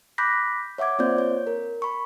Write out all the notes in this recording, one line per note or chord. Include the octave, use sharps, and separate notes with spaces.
B5 D6 F#6 G6 A#6 B6
C#5 E5 F#5 D6 G#6
A#3 C4 F4 C5 D5 G6
C#5
A#4
B5 C#6